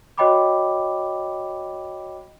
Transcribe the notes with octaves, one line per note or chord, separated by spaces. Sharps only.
F#4 C#5 D#5 G5 B5 D6